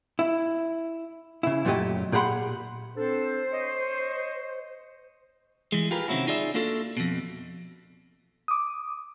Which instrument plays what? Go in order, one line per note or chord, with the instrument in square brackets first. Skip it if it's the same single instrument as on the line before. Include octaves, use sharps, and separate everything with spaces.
[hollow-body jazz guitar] E4
C#3 E4
F#2 A#2 F#3 A3 G4 D#5
A#2 G4 G#4 F#5 B5 C6
[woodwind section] C4 D4 A4 [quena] C5
[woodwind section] C#5 D#5
[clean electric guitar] E3 G#3
F4 G4 G#4 A#4 B4
C3 D#3 C4 C#4 E4 F#4
D#4 F4 G#4 D5 E5
A#3 D4 F4 F#4 A4
F2 B2
[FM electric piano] D6 D#6